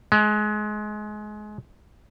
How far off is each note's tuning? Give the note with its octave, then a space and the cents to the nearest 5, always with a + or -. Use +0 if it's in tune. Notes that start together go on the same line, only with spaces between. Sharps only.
G#3 +25